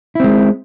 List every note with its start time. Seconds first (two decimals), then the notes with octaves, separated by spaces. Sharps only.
0.15 E4
0.20 C4
0.24 G#3